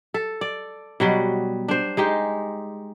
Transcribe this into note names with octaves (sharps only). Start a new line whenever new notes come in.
A4
D5
B2 F#3 G3
D4 C5
G#3 D#4 G4